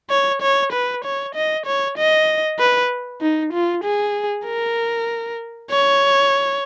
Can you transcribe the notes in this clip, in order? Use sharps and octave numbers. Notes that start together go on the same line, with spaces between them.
C#5
C#5
B4
C#5
D#5
C#5
D#5
B4
D#4
F4
G#4
A#4
C#5